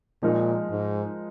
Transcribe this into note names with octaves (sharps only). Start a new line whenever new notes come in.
A#2 F3 G#3 D#4 A#4
G#2